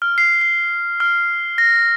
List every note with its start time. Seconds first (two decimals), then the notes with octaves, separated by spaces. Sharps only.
0.02 F6
0.18 C7
0.41 C7
1.00 F6
1.58 A#6